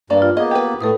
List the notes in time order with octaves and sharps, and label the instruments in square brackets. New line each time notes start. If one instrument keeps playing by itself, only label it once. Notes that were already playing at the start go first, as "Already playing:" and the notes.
[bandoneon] G2 [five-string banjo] A#3 D5
[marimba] F4
[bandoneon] A#3 B3 [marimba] G#4 [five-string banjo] D#5
[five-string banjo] G4 B4
[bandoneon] A2 [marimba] A4 B4 D#6